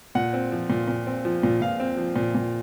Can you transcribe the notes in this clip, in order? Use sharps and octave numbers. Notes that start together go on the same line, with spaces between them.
A#2 F#5
C4
F3
A#2
A#2
C4
F3
A#2
A#2 F5
C4
F3
A#2
A#2